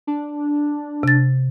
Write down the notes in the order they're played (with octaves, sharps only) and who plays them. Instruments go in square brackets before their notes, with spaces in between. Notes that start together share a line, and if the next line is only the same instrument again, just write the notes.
[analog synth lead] D4
[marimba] C3 A6